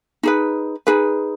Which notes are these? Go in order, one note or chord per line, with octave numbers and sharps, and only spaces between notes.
D#4 G#4 B4
D#4 G#4 B4